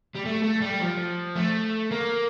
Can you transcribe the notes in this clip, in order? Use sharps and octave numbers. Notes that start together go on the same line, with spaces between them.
G3
A3
A3
G3
F3
A3
A#3